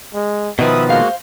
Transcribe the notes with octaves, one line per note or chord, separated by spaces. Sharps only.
G#3
B2 D#3 F3 B4 E5 B5 D#6
G#3 A#3 F#4 C5 F5